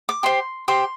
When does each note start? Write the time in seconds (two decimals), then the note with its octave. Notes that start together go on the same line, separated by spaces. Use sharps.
0.09 D6
0.23 G4 C5 C6
0.68 G4 C5 C6